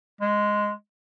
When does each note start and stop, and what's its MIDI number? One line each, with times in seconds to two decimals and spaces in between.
0.21 0.71 56